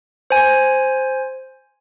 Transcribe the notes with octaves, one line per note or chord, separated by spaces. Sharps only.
C5 G#5